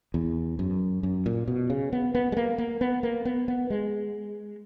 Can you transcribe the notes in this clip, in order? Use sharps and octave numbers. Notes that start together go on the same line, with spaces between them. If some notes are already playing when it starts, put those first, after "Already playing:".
E2
F#2
F#2
A#2
B2
C#3
B3
B3
G#3
A#3
A#3
B3
A#3
B3
B3
G#3